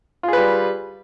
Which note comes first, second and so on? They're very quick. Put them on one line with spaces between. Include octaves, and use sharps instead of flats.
F4 G#4 B4 G3